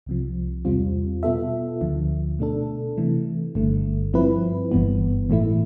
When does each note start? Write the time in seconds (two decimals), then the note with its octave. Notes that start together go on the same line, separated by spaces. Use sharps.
0.06 C2 C3 F3
0.65 E2 C3 G3 C4 F4
1.23 B2 B3 F4 A4 E5
1.81 D2 D3 F3
2.39 B2 A3 D4 A4
2.97 C3 E3 A3
3.55 G1 G2 D3 A3
4.13 G2 F3 C4 E4 B4
4.72 G1 G2 E3 B3
5.30 A2 E3 A3 E4